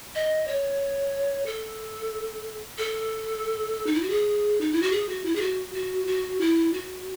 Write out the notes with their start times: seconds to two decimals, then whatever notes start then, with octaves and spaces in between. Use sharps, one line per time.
0.15 D#5
0.48 C#5
1.46 A4
2.78 A4
3.86 D#4
3.94 E4
4.02 F#4
4.10 G#4
4.61 D#4
4.72 E4
4.82 F#4
4.92 G#4
5.09 F#4
5.25 E4
5.36 G#4
5.41 F#4
5.74 F#4
6.07 F#4
6.41 E4
6.73 F#4